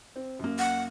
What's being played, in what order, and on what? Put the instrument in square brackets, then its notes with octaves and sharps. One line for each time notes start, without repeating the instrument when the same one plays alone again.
[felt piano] C4
F#2 A#3
[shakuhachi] F#5